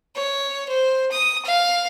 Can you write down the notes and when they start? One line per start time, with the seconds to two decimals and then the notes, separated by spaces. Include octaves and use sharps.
0.16 C#5
0.68 C5
1.11 D#6
1.45 F5